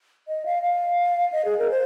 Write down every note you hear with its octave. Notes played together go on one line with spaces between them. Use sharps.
D#5
F5
F5
D#5
G#4
A#4
C5